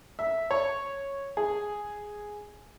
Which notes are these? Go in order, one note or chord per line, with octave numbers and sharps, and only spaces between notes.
E5
C#5
G#4